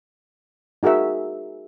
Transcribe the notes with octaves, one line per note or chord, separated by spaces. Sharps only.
D#4 F#4 G#4 A#4 E5